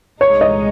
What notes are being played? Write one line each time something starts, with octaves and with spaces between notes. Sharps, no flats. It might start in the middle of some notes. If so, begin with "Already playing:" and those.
C2 A#2 G#3 D#4 C#5
D#5